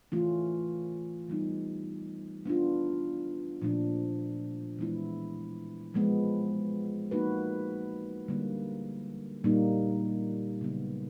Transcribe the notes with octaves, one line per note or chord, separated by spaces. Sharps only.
E3 A3 C#4 F4
E3 G3 B3 D#4
B3 D4 F4
A#2 F3 A3 D4
E3 G#3 B3 E4
F3 G#3 B3
F3 A#3 D#4 F#4 B4
D3 G3 A#3
A#2 G3 A#3 D#4
C#3 F#3 B3